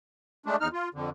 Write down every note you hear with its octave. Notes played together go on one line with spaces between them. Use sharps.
G#3 A3 D4
E2 D#4 F6
F4
F2 D3